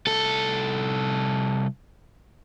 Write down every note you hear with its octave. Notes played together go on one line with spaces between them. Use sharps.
C2 A4